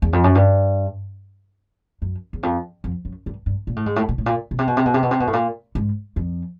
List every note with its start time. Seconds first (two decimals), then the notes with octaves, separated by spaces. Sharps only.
0.02 E2
0.13 F2
0.24 F#2
0.35 G2
2.02 F#2
2.33 E2
2.43 F2
2.84 F2
3.05 F#2
3.26 G2
3.46 G2
3.67 A#2
3.76 A2
3.86 G#2
3.96 A2
4.09 A#2
4.18 A2
4.26 A#2
4.51 B2
4.59 C3
4.67 B2
4.77 C3
4.86 B2
4.94 C3
5.03 B2
5.11 C3
5.20 B2
5.27 A2
5.33 A#2
5.75 G#2
6.16 F2